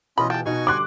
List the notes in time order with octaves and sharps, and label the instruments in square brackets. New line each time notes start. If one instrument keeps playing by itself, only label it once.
[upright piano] B2 E3 [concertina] C#4 F4 D#5 [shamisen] B5
[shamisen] F4 G#4 [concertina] G5 A5
[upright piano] B2 D#4 [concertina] F#4 G#5 C#6
[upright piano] G1 G3 C6 [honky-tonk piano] D6 F#6